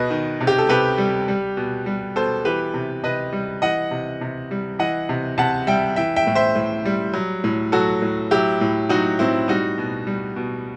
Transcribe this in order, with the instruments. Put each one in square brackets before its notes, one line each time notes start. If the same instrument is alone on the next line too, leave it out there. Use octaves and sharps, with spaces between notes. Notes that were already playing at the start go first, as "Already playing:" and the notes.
Already playing: [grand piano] B2 B4 D#5
D#3
C3
G4
A4
C3 G4 B4
G3
G3
B2
G3
B2 A4 C5
E3 G4 B4
C3
C3 B4 D#5
G3
E3 D#5 F#5
C3
C3
G3
E3 D#5 F#5
C3
C3 F#5 A5
G3 E5 G5
E3 E5 G5
E5 G5
A2
C5 E5
A2
G3
F#3
A2
F#3 F#4 A4
A2
F#3 E4 G4
A2
F#3 D#4 F#4
A2 C4 E4
G3 D#4 F#4
B2
G3
B2